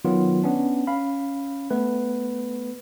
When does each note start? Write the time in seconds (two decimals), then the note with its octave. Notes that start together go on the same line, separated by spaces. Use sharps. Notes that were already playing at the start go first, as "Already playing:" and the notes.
0.05 D#3 F#3 B3 F4
0.43 B3 C#4 D4
0.87 C#4 F5 B5
1.71 A3 B3 B4